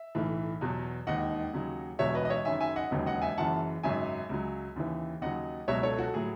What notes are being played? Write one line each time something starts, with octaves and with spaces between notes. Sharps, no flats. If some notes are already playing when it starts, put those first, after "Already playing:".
Already playing: E5
B1 A2 E3
E2 B2 F#3
E1 D#2 D#3 D#5 F#5
D#2 C#3 F#3
E1 E2 B2 F#3 C#5 E5
B4 D#5
D#5
C#5 E5
F#1 F#2 D#3 E5 G#5
E5 G#5
D#5 F#5
E1 D#2 C#3 F#3
D#5 F#5
E5 G#5
F#1 F#2 E3 F#5 A5
G#1 F#2 C#3 F#3 E5 G#5
C#2 C#3 F#3
D#2 C#3 E3
D#2 C#3 F#3 D#5 F#5
C#2 B2 F#3 C#5 E5
A4 C#5
F#4 A4
A2 F#3 G#4